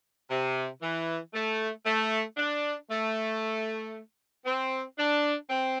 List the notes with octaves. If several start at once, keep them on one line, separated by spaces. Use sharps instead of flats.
C3
E3
A3
A3
D4
A3
C4
D4
C4